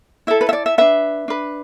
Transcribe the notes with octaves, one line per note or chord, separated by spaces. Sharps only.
E4 A4 E5
B4
E5
D5
E5
D4 B4 E5
D4 B4